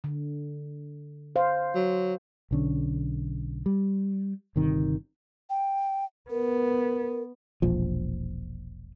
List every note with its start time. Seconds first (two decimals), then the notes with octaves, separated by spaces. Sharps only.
0.04 D3
1.36 C5 F5
1.75 F#3
2.51 B1 D3 C#4
3.66 G3
4.56 G1 C3 D#3
5.50 G5
6.30 B3 A#4
7.62 E1 A#1 F3